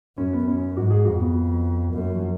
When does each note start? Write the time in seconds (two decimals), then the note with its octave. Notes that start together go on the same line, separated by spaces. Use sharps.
0.17 F#2 C#4
0.33 B3
0.47 F#2 C#4
0.76 G#2 F#4
0.90 G#4
1.05 F2 F#4
1.20 B3
1.93 F#2 A#3
2.14 F3
2.22 F#3